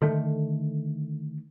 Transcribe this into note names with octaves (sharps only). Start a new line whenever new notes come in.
D3 D#3 A3